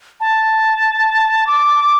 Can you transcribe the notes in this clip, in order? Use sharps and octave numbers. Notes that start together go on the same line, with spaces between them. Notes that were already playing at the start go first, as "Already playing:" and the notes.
A5
D6